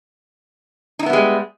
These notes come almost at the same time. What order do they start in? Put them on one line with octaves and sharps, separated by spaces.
D#4 E4 B3 G3 G#3